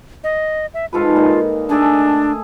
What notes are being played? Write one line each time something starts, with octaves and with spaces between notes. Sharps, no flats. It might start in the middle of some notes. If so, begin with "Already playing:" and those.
D#5
E5
G#2 F4 A4 B4
A#2 D#4
A3 D4 G#4 A5